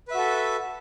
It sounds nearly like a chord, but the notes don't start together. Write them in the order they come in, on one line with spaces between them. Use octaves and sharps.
B4 E5 F#4 A4